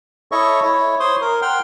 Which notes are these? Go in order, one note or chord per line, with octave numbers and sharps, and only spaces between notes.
E4 A4 C#5 D#5 E5 C#6
E4 C#5
C5 C#5 C6 D#6
A#4
F#5 G5 C6 F6